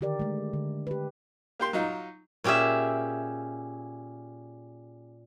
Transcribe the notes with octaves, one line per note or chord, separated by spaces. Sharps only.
D3 D#3 G4 A#4 D5
G#3 A3
D3
G4 B4
A#3 G4 C6
F#3 D#4 F4
A#2 C#4 G4 G#4 E5